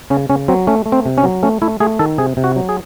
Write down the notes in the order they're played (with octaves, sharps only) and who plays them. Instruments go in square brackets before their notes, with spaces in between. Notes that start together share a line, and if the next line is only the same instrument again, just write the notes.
[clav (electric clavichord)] C#3 C#4
C#3 C#4
F#3 C4
A3 C#4
A3
C4
C3
C#4
F#3
A3 C#4
A3 E4
A3 G#4
D#3 A4
C3 G#4
C3
F#4
F#3
G#4